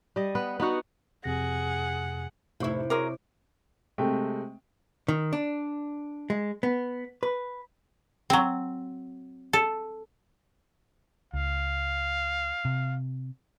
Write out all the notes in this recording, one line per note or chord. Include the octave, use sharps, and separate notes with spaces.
G3 D#5
B3 B4
B3 D#4 F#4 F#5
F2 C3 G#4 F#5 A#6
F1 A2 C3 E4 C#6
F#4 G#4 A#4 C#5 C6 D6
C3 G#3 A3 G5
D#3
D4
G#3
B3
B4
F#3 C4
A4
C#2 F5
C3